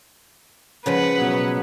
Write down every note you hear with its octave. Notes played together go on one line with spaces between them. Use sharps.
C#3 F3 G#3 B4 F#5
B2 F#3 B3